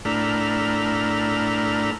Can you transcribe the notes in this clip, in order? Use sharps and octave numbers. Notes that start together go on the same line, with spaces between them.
A2 A3 D4 E4 A#4 F6